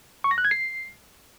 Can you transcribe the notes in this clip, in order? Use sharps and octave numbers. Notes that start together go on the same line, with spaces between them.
C#6
A#6
F#6
G#6
C7